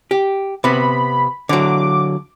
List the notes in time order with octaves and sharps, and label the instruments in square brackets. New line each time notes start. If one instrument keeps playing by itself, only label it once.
[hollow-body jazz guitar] G4
[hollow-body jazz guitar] C3 B3 [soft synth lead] B5
[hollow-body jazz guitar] D3 F#3 [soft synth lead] D6